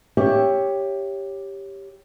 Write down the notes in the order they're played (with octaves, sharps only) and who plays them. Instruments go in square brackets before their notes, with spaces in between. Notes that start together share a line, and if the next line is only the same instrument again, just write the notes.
[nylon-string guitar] G4 C#5 E5